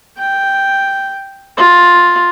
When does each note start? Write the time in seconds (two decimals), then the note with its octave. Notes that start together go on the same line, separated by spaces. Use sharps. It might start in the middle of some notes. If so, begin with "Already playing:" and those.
0.18 G5
1.57 F4